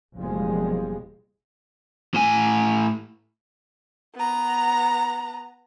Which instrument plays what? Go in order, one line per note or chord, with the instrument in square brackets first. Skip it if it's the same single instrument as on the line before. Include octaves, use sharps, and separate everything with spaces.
[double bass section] F#1 E2 B2 F3 G3 G#3
[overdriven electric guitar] A2 G#5
[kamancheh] B3 A#5